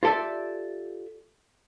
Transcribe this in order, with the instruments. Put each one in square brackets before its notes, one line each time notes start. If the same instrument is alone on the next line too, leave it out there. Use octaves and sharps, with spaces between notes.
[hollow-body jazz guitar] F4 G4 A4 D5 E5